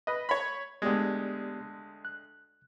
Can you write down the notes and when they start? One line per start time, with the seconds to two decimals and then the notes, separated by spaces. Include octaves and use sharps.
0.07 B4 D#5
0.29 C#5 B5
0.82 D2 G#3 B3 G4 D5
2.05 F#6